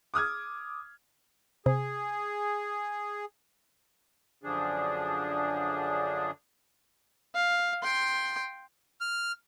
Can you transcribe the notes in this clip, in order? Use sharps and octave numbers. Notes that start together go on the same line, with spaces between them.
D6 D#6 F6 G#6
C3 G#4
F#2 D3 F3 D4 G#4
F5
G5 C6
F6